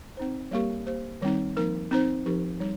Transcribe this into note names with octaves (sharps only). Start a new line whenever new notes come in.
C4 D#4 C5
G3 A#3 G4 A#4
A#3 G4 C5
D#3 G3 C4 D#4
F3 A#3 D#4 A#4
C4 D#4 C5
F3 D#4 G4 A#4
G3 D#4